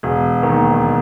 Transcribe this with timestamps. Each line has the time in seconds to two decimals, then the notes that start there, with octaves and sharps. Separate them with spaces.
0.03 E1
0.43 D#2 D#3